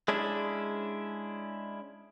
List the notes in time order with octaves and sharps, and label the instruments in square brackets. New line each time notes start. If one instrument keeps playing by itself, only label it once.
[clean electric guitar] G#3 C#4 D4 E4